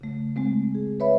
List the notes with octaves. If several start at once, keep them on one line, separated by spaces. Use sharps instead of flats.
C#3 A3
G#3 A3 C4
G#4
B4 C#5 E5 B5